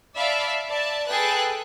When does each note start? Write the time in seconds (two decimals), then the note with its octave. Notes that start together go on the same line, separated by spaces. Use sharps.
0.15 D5 E5 F5 A5 B5
0.68 D5 E5 A5
1.06 G#4 A4 B4 G5 A5 F#6